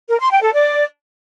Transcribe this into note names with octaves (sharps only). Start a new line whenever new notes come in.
A#4
C6
G5
A4
D5